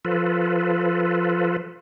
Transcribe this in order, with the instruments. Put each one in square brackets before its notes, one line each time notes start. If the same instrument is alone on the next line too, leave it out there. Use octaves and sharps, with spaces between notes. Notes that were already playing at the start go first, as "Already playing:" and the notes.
[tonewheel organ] F3 F4 A4 B4